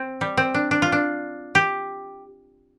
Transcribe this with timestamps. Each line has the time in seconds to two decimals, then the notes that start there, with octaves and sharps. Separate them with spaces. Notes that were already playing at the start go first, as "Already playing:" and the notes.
Already playing: C4
0.21 G3
0.37 C4
0.54 D4
0.71 D4
0.82 F4
0.92 D4
1.55 G4